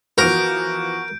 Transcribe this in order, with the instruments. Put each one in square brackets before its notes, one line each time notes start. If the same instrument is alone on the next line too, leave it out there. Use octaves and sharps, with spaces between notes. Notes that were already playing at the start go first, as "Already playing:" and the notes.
[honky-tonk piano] E3 F3 B3 [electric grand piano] F#4 [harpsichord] A#4 [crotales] G6 D7